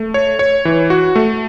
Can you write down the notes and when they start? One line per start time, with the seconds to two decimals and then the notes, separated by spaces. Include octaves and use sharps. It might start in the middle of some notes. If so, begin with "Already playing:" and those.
Already playing: A3
0.14 C#5
0.39 C#5
0.65 E3
0.90 F#4
1.16 A3